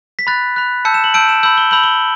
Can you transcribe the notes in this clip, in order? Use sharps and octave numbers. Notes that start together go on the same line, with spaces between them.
B6
B5 F#6 A6
B5 F#6
A5 E6 G6 C#7
E7
F#7
A5 E6 G6 D7
E7
B5 E6 G6 F#7
G7
B5 E6 G6 F#7
G7